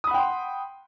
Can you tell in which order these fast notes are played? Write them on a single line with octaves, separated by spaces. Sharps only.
D#6 B5 F#5 G5 C6